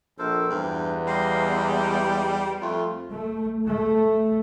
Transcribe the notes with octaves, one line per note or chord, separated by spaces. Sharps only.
A#1 A4 A#4 C5
E2 G2 G5
G3 D#5 F5 C6
G#3 G5
F2 A3 F4
A3
A3